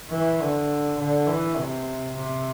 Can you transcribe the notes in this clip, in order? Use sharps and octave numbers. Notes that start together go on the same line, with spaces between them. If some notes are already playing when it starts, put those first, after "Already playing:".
E3
D3
D3
E3
C3
C3